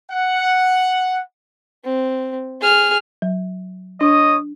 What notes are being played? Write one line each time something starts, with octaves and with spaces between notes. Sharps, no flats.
F#5
C4
G#4 F6
F#3
D4 C#5 D#5 D#6